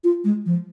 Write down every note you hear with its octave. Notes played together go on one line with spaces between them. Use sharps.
F4
G#3
F3